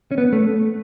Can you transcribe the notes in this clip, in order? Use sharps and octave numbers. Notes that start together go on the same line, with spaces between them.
C#4
B3
A3